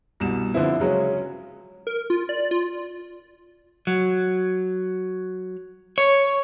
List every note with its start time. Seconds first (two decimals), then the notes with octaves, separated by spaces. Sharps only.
0.20 C2 B2 E7
0.54 D3 F3 C4 E4
0.80 C#3 F#3 G#3 C#4
1.87 A#4
2.10 F4
2.29 D5
2.51 F4
3.87 F#3
5.98 C#5